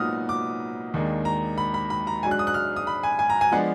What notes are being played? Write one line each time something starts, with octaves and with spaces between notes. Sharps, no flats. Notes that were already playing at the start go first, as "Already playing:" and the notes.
Already playing: A#2 F#3 B3 D#4 D#6 F6
D6
D#2 D#3 G#3 D4
A#5
B5
B5
B5
A#5
G#2 F#3 D4 G#5
F#6
D#6
F#6
F6
D#6
B5
G#5
G#5
A#5
G#5
F3 G#3 B3 D4 F#5